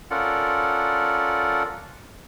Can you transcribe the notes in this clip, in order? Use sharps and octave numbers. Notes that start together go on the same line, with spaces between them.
C#4 F4 A4 A#4 D5 F#5